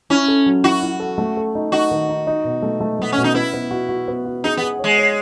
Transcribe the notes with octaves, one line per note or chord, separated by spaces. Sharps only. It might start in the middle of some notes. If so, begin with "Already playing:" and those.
C#4 E4
A4
F#3
E4 F#4
E4
A4
A3
A4
D#4
D#4 F#4
D#3
D#4
D#4
B2
A3
A3
A3 B3
C#4
B2
D#4
E4 B4
B3
F#4
F#4
B3
F#4
D#4 G#4
B3 G#4
G#3 C#5
C#5